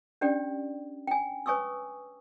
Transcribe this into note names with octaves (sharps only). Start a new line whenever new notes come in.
C#4 D4 G4 D5 G5
G5 G#5
B4 C#5 G#5 C#6 D#6 E6